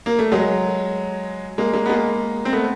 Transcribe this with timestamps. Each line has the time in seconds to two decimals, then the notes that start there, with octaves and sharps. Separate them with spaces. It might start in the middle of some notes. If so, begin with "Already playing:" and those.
0.06 A#3
0.19 A3
0.32 F#3 G#3
1.58 G#3 A#3
1.73 G#3 A#3
1.86 B3
1.89 G#3 A#3
2.45 C4
2.53 A3 B3